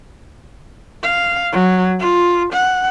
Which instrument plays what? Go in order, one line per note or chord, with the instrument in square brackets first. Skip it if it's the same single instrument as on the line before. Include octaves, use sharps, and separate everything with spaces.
[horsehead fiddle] F5
F#3
F4
F#5